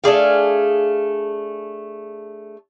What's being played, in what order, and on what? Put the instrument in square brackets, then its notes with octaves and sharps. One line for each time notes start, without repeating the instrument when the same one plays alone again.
[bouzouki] A3 D4 G#4 F5